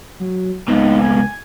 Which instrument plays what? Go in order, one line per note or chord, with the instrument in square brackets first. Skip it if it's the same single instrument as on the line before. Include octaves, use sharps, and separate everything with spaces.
[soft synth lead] F#3
[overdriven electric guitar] C#2 B2 [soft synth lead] D#4
[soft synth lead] G#5